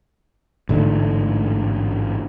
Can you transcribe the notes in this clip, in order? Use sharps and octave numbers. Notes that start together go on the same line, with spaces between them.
A1 G#2 D3 A3